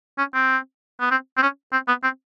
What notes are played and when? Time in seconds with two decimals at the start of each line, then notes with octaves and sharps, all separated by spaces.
0.18 C#4
0.34 C4
1.00 B3
1.11 C4
1.37 C4
1.42 C#4
1.73 C4
1.88 B3
2.03 C4